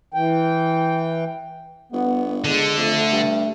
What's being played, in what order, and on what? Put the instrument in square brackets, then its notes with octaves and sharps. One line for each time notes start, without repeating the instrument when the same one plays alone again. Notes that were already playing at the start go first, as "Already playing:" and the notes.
[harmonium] E3 G5
[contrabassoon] G1 [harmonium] B3
[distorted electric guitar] D3 [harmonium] G#3
[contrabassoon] F2 [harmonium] A3
[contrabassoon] G2